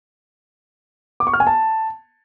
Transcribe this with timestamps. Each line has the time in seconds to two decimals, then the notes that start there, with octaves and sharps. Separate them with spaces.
1.20 D6
1.27 C#6
1.33 F6
1.40 G#5
1.47 A5